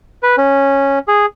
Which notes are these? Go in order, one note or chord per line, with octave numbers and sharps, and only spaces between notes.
B4
C#4
G#4